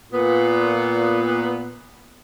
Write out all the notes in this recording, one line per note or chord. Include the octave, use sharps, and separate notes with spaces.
A#2 B3